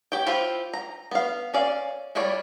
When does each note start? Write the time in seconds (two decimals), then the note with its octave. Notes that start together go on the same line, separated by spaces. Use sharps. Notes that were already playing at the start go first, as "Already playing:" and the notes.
0.12 G4 C#5 G5
0.26 E4 F4 G4 C5
0.73 A#5
1.11 B3 F5
1.54 C#4 D5 F5
2.15 G3 E4 F4 C#5 D5